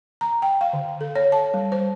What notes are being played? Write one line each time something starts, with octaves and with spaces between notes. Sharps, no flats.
A#5
G5
F5
D3
A4
C#5
A5
G3
C5